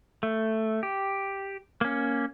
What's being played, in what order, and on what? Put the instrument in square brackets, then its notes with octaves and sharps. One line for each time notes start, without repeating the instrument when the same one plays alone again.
[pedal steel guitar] A3
G4
A#3 C#4